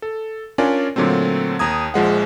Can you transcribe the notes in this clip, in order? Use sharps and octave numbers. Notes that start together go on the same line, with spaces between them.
A4
C#4 D4 F4 A#4 D5 G#5
A#2 D3 F#3 A3 C4
D#2 A#5 D#6 G#6
A#1 F3 G#3 F#5